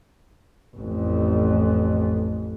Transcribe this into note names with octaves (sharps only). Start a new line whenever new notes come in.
A1 F2